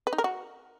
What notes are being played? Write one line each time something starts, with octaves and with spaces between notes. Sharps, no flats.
B4
D#4
A#4
F#4